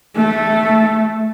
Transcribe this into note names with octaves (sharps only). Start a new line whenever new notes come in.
A3